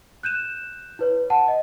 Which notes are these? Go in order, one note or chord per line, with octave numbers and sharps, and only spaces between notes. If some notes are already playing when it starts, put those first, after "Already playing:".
F#6 G6 D#7 E7
E4 B4 C#5
F#5 A5
D#5